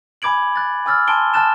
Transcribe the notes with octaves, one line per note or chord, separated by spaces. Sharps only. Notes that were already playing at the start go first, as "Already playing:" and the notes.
G#5 B5 D6 G#6 D7 F#7
F#6 A6
G#5 D6 E6 F6 A6
G#5 A5 C6 D7 G7
G#5 A5 F6 F#6 A6 E7